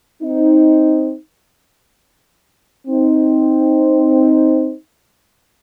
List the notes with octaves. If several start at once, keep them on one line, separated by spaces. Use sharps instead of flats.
C4 D#4
C4 D#4